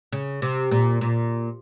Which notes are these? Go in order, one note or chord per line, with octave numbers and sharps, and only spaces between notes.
C#3
C3
A#2
A#2